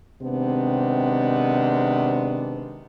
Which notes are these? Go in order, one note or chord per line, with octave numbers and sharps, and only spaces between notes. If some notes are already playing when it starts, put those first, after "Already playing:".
C3 D#3 G#3 B3 C4 D4